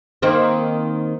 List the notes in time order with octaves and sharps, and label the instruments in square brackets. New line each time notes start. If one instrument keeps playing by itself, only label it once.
[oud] D#3 A#3 C4